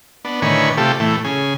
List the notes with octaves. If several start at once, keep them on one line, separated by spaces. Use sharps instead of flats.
B3 D4
A2 D3 D#3 B4 C#5 G#5
C3 A3 F4 G4 A4
A2 E3 A3
C#3 G#4